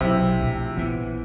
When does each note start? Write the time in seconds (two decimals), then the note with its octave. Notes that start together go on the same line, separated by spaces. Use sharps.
0.01 B1 C3 E4
0.41 A#1 A3
0.77 A#1 E3 B3